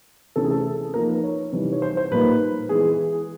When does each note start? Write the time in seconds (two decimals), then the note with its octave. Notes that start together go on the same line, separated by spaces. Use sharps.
0.36 C3 E3 A3 C#4 A4
0.44 G#4
0.51 A4
0.94 F3 A#3 D#4 A#4
1.09 B4
1.24 C#5
1.52 C3 E3 G3 C4 D#4
1.72 C#5
1.82 C5
1.97 C5
2.11 A#2 G3 A#3 D#4 B4
2.69 E3 G#3 B3 G#4